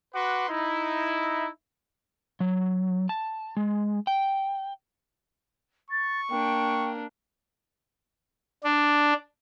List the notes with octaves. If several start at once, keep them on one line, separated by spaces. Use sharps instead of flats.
F#4 B4 F#5 C6 D6
D#4 E4
F#3
A5
G#3
G5
C#6 A6
A#3 D4 G5
D4